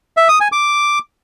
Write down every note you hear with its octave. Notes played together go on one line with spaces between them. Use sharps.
E5
D#6
G#5
D6